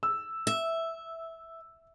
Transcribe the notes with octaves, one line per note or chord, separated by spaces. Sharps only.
E6
E5